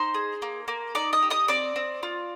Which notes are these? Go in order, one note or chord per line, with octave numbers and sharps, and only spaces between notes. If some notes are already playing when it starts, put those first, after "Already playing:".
Already playing: D#4 C5 C6
G#4
A#3
A#3
D#4 D5 D6
D#5 D#6
G4
D#5 D#6
C4 D5 D6
C4
F4